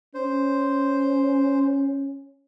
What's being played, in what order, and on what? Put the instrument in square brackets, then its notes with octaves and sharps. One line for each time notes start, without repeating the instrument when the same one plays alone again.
[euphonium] C#4 [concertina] C5